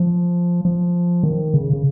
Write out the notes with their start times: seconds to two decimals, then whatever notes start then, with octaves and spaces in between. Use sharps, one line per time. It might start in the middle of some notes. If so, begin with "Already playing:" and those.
Already playing: F3
0.65 F3
1.23 D#3
1.54 C#3
1.73 C#3